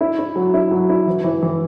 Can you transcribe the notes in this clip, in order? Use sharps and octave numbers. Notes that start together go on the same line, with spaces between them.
E4
E4
F#3
E4
F#3
E4
E3
E3
E3